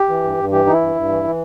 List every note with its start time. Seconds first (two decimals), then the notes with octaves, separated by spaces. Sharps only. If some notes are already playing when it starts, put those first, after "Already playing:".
Already playing: G4
0.09 E3
0.23 G2
0.38 G2
0.52 E3 G4
0.66 E3 D#4
0.73 E4
0.81 G2
0.96 G2
1.09 E3
1.24 E3